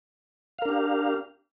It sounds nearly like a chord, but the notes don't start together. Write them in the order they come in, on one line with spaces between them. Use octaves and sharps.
F5 A#4 D4 G4